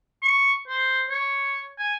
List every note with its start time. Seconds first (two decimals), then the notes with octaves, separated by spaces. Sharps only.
0.23 C#6
0.68 C5
1.10 C#5
1.79 G#5